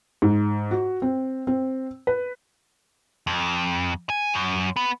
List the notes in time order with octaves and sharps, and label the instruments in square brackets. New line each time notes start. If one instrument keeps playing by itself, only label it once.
[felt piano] G#2
F#4
C4
C4
B4
[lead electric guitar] F2
G#5
F#2
B3